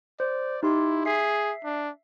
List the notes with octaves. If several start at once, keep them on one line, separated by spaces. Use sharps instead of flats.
C5 D5
D#4 E4 G4 C6
G#4 E5 B6 C7
D4